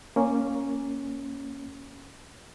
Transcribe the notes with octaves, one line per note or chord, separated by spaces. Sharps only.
A#3 C#4